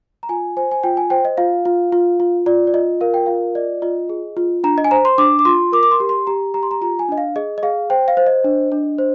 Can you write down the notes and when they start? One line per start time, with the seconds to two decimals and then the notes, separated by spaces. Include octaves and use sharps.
0.23 A#5
0.29 F4 G#5
0.57 C5 G#5
0.71 G#5
0.83 F4 G5
0.97 G#5
1.10 C5 G5
1.25 D#5
1.37 F4 F5
1.65 F4
1.92 F4
2.20 F4
2.46 F4 D5
2.67 D5
2.74 F4 D#5
3.01 A#4 F5
3.14 G5
3.26 F4 F5
3.55 D5 D#5
3.82 F4 D#5
4.09 G#4
4.37 F4
4.64 D4 A#5
4.78 D#5
4.84 G#5
4.91 C5 A#5
5.05 C6
5.18 D4 D6
5.39 D6
5.45 F4 C6
5.72 A#4 D6
5.83 D6
5.91 C6
6.00 G4
6.09 C6
6.27 G4 A#5
6.54 G4 A#5
6.63 C6
6.71 A#5
6.82 F4 A#5
6.99 G#5
7.09 D4 D#5
7.18 F5
7.36 G#4 D#5
7.58 D#5
7.63 G#4 F5
7.90 C5 G5
8.08 F5
8.17 C5
8.27 D#5
8.44 D4
8.72 D4
8.98 C5